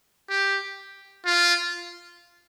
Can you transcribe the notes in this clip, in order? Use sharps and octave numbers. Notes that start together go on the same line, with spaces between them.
G4
F4